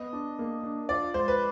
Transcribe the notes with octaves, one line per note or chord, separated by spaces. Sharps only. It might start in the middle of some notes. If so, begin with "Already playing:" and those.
Already playing: B3 D#5
D4
A#3
D4
F4 D5
G#3 C5
B4